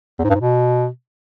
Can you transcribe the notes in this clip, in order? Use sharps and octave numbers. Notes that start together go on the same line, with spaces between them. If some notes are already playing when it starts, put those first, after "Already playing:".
E2
G#2
G2
G#2
B2